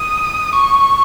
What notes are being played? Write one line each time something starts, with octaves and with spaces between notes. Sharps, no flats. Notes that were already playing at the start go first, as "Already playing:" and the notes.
Already playing: D#6
C#6